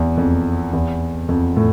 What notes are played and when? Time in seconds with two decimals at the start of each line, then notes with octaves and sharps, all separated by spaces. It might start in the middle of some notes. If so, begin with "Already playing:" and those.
Already playing: E2
0.17 F2
0.73 E2
1.29 F2
1.57 A2